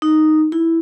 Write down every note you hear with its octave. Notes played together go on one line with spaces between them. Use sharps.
D#4
E4